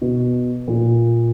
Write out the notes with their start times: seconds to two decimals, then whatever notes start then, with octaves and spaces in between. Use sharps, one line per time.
0.02 B2
0.68 A#2